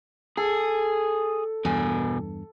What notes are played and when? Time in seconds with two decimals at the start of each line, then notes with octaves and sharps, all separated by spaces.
0.37 G#4 A4
1.65 E2 G2 B2 G#5